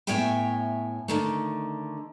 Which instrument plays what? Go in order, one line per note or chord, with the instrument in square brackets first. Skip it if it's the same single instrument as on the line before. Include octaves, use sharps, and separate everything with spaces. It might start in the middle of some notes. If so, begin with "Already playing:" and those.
[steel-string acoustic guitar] A2 B3 C#5 E5 G5 G#5
D3 D#3 A3